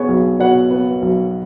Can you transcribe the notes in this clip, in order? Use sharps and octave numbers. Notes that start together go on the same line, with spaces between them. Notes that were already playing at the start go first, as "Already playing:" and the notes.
Already playing: B3 G#4 C#5
B1
B2 C#5 F#5
B3
B1